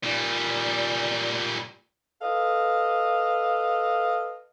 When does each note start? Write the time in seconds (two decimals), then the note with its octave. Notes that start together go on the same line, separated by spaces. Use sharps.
0.03 A#2 G3 D5
2.22 A4 B4 D#5 F5